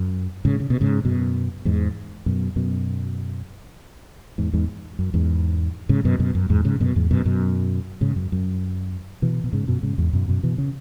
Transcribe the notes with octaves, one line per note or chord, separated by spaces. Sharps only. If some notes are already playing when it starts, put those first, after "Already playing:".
Already playing: F#2
G#2 C#3
C#3
B2
G#2 C#3
F#2 B2
E2 G#2
F#2 B2
F#2 B2
E2 G#2
E2 G#2
F#2
E2 G#2
G#2 C#3
F#2 B2
F#2 B2
F#2
E2 G#2
G#2 C#3
F#2 B2
E2 G#2
F#2 B2
F#2 B2
G#2 C#3
F#2
F#2
B2 E3
B2
G#2 C#3
F#2 B2
G#2 C#3
E2 G#2
F#2 B2
F#2 B2
B2 E3
C#3